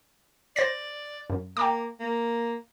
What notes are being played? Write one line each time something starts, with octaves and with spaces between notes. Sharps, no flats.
C5 D5 A6 A#6
F#2
A#3 G5 A#5 D6
A#3